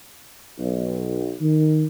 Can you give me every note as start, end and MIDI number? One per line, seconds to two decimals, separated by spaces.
0.58 1.33 35
1.41 1.85 51